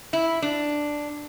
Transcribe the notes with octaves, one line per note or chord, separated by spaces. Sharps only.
E4
D4